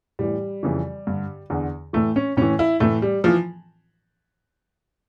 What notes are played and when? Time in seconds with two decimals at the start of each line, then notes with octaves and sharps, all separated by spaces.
0.19 A2 E3 G3
0.63 F2 C#3 E3
1.07 G2 D3
1.50 E2 D3
1.93 A2 E3 A3
2.16 C#4
2.37 A2 E3 C#4
2.59 E4
2.80 A2 E3 A3
3.02 G3
3.24 E3 F3